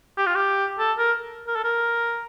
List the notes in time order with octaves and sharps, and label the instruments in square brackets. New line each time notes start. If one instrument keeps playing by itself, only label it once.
[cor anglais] G4
F4
G4
A4
A#4
A#4
A4
A#4